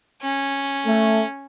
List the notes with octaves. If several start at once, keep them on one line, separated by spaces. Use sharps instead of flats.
C#4
A3